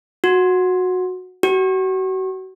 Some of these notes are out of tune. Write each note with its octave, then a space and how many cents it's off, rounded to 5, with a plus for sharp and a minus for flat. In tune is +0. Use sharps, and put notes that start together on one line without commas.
F#4 -15
F#4 +35